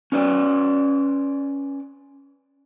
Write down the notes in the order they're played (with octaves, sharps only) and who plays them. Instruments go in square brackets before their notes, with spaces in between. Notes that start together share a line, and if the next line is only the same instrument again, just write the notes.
[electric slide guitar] C#4 B4 D5